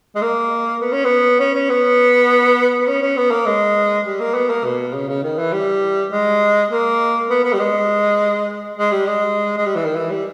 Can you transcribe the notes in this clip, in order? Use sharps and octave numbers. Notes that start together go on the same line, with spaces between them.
G#3
A#3
B3
C#4
B3
C#4
C#4
B3
B3
C#4
C#4
B3
A#3
G#3
G3
A#3
B3
A#3
B2
C#3
C#3
D#3
E3
G3
G#3
A#3
B3
B3
G3
G#3
G#3
G3
G#3
G#3
G3
E3
D#3
E3
G3